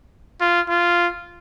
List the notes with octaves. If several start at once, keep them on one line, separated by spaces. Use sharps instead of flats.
F4
F4